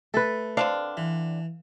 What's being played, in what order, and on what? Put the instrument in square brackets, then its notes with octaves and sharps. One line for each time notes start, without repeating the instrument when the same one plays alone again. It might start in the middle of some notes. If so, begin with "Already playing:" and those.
[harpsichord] A3 [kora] A4 B4
[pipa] D3 C4 D4 [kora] F5
[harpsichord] E3